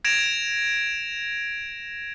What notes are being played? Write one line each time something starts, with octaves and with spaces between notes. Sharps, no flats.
G#6 A#6 D7 E7 F7